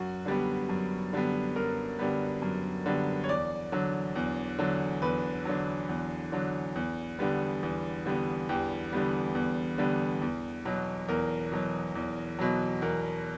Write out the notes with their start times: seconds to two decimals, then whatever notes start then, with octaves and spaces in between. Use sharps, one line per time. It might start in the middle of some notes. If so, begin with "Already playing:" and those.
Already playing: F#2 F#4
0.25 D3 G3 B3
0.69 F#2
1.13 D3 G3 B3
1.56 F#2 A#4
1.99 D3 G3 B3
2.42 F#2
2.86 D3 G3 B3
3.24 C#5
3.29 E2 D5
3.72 D3 F#3
4.15 E2
4.59 D3 F#3
5.02 E2 B4
5.45 D3 F#3
5.89 E2
6.32 D3 F#3
6.75 E2
7.19 D3 G3 B3
7.63 E2
8.06 D3 G3 B3
8.49 E2 G4
8.93 D3 G3 B3
9.35 E2
9.78 D3 G3 B3
10.22 E2
10.65 B2 F#3
11.08 E2 A#4
11.52 B2 F#3
11.95 E2
12.39 B2 F#3
12.82 E2 A#4